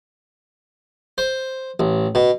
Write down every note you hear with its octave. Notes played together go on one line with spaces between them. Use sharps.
C5
A1
B2